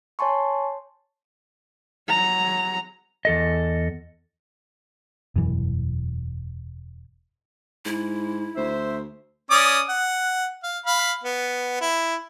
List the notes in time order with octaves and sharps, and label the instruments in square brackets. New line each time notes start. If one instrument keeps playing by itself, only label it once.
[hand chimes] C#5 G#5 A5 C6 C#6
[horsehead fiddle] F#3 A#5
[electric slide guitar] E2 A4 D#5
[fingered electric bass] E1 F#2 E3
[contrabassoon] G#2 [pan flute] E4
[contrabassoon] D2 [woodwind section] C5 E5
[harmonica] C#4 D5 D#6
F#5
F5
F5 B5
B3
E4